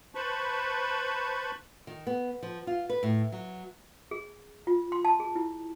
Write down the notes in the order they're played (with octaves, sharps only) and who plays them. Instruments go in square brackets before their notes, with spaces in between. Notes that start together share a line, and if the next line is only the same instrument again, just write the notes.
[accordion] B4 C5 A5 B5 C#6
[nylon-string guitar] D#3
B3
F3
F4
B4
A2
F#3
[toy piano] G#4
F4
C6
A5
G#4
E4